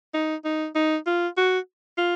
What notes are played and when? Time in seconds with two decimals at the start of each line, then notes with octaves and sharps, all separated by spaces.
0.14 D#4
0.45 D#4
0.75 D#4
1.06 F4
1.37 F#4
1.98 F4